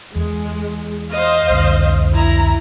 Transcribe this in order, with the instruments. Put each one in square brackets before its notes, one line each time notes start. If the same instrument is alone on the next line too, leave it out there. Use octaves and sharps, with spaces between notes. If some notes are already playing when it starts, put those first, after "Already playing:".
[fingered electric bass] E2 [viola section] G#3
[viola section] C5 D#5 F5
[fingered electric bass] C2 F2 D3
[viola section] E4 A#5